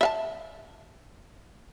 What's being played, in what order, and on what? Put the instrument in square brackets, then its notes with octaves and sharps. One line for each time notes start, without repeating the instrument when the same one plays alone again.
[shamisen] E5 F5 A5